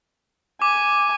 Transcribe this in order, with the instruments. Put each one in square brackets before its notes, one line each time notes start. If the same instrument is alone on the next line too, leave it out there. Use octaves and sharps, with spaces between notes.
[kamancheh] G#5 [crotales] D6